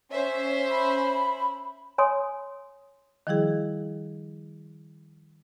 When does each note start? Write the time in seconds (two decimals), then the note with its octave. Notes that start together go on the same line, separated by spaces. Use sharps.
0.11 C#4 C5 C#5 E5
0.71 B5
1.98 C#5 G#5 C6 D#6
3.27 D#3 F3 G3 E4 G#4